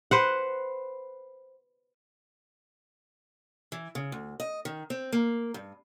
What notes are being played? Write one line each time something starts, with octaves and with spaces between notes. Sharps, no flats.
B4 C5 F#5
E3
C#3
D2
D#5
D#3
C4
A#3
G2